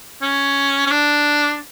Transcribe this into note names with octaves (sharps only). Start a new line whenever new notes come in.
C#4
C#4
D4